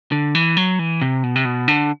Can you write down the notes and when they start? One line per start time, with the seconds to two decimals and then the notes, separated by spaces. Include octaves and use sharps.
0.12 D3
0.35 E3
0.57 F#3
0.79 E3
1.01 C3
1.23 B2
1.36 C3
1.45 B2
1.68 D3